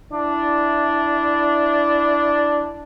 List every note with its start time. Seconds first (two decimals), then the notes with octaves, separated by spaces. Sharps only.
0.12 D4 E4